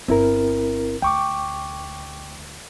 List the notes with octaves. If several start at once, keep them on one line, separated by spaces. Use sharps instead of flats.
G1 C4 E4 A#4
D2 G5 C#6 D6